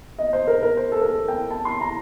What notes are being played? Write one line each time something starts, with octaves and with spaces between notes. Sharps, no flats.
D#5
C5
A#4
A#4
C5
A4
A#4
A4
G5
A5
C6
A#5